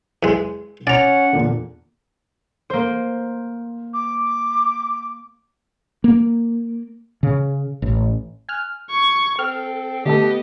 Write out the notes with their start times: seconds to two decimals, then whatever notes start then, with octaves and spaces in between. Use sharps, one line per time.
0.23 E2 G#3
0.87 C#4 D5 F#5 A#5
1.33 E2 A#2 D3
2.70 A#3 C5
3.94 D6
6.04 A#3
7.23 C#3
7.82 A1
8.49 G#5 F6 F#6
8.90 C#6 G#6
9.39 C4 A4 F6
10.05 D3 A3 B3 G4 A4 D#5